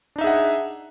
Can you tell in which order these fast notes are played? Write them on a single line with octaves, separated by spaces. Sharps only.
D4 D#4 E5 G#4 F#5